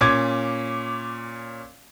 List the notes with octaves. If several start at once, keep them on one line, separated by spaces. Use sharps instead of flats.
A#2 C#4 D6 G#6